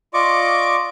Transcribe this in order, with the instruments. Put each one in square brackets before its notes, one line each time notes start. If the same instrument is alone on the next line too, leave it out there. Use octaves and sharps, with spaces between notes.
[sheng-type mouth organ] F4 D5 D#5 C#6 D6